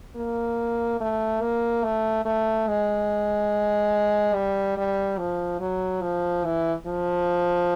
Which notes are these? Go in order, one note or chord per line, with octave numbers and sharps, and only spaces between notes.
A#3
A3
A#3
A3
A3
G#3
G3
G3
F3
F#3
F3
E3
F3